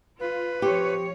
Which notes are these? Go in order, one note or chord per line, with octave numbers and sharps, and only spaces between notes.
F4 B4
F3 C4 G4 C#5